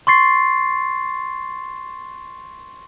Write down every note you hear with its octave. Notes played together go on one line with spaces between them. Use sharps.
C6 C#6 A6 C7